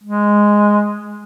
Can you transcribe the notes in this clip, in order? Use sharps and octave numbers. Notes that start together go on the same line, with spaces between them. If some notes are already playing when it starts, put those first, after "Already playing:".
G#3